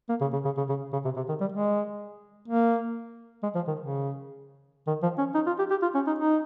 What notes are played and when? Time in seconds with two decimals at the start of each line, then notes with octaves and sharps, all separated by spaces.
0.09 A#3
0.21 C#3
0.33 C#3
0.45 C#3
0.57 C#3
0.69 C#3
0.93 C#3
1.05 C3
1.16 C3
1.29 D#3
1.41 G3
1.52 G#3
2.48 A#3
3.43 G#3
3.55 F3
3.67 D#3
3.79 C#3
4.87 D#3
5.03 F3
5.18 C#4
5.35 D#4
5.47 F4
5.59 G4
5.70 G4
5.82 F4
5.94 C#4
6.07 D#4
6.19 D#4